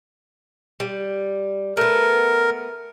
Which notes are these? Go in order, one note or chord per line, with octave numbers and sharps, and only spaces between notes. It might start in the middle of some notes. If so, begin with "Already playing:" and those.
G3
A3 B3 A#4